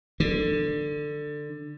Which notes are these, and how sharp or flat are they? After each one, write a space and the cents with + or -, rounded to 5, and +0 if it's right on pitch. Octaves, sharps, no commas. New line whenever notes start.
D3 +15